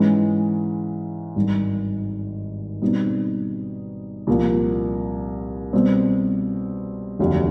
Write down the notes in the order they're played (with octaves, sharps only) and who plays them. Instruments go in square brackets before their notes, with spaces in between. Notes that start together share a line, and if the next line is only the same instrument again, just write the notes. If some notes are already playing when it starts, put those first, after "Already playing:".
Already playing: [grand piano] G#2 E3 G#3 C#4
G#1 G2 D#3 G3
B2 G3 C4 D#4
C2 A#2 F3 A#3
B2 G3 C4
F1 D#2 D3 F#3